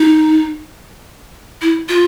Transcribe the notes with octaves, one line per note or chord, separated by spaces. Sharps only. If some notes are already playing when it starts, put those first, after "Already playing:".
Already playing: D#4
E4
F4